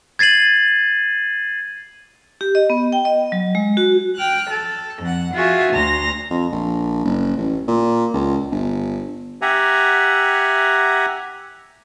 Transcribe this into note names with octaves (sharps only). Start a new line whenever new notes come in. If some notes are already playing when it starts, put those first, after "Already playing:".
G#6 A6 C7 D#7 F#7
G4
D#5
B3
G5
D#5
F#3
G#3
F#4
G5 F6 F#6
A4
F2 F#5
F4 F#4 G#4 E5
D2 A#5 C6 A#6
F2
A#1
F#1
A1
A#2
C#2
G1
G4 E5 F#5 G#5 A#5